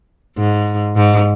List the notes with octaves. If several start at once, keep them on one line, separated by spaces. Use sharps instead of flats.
G#2
G#2